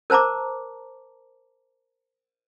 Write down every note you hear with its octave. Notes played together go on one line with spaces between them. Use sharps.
A#4 C5 A5 A#5 D6